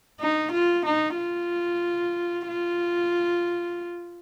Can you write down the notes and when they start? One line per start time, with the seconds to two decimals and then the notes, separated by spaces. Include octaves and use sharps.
0.20 D#4
0.52 F4
0.86 D#4
1.17 F4
2.48 F4